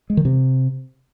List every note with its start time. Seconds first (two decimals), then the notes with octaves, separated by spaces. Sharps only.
0.10 G#3
0.17 D#3
0.25 C3